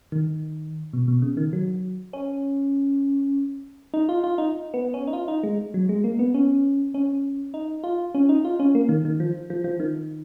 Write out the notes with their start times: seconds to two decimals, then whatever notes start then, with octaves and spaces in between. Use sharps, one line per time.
0.12 D#3
0.93 B2
1.08 B2
1.22 C#3
1.37 D#3
1.53 F#3
2.13 C#4
3.94 D#4
4.09 F4
4.24 F4
4.38 D#4
4.74 B3
4.94 C#4
5.07 D#4
5.13 F4
5.28 D#4
5.43 G#3
5.74 F#3
5.89 G#3
6.04 A#3
6.19 B3
6.34 C#4
6.94 C#4
7.54 D#4
7.84 F4
8.15 C#4
8.29 D#4
8.45 F4
8.60 C#4
8.75 A#3
8.89 D#3
9.05 D#3
9.20 F3
9.50 F3
9.64 F3
9.80 D#3